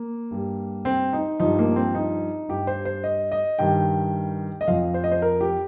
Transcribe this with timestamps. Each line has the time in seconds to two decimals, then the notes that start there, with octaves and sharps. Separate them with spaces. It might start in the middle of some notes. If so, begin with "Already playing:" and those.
Already playing: A#3
0.31 G2 G3
0.85 C4
1.13 D#4
1.40 G2 F3 D#4
1.59 A#3
1.76 C4
1.95 D#4
2.49 G2 G3 G4
2.67 C5
2.85 C5
3.04 D#5
3.32 D#5
3.59 G2 D#3 G3 G5
4.61 D#5
4.68 F2 F3 F5
4.94 C5
5.04 D#5
5.12 C5
5.22 A#4
5.41 G4